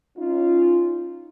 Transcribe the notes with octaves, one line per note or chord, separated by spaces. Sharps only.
C#4 D#4 F4